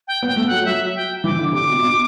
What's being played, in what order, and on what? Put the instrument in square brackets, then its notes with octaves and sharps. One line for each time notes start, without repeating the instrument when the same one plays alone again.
[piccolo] G5
[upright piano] B3
[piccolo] G5
[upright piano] A3
[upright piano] F#3 [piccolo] F#5
[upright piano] F#3 [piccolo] E5
[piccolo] G5
[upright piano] E3 [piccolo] D6
[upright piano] D3
[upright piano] C3 [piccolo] D6
[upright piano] B2
B2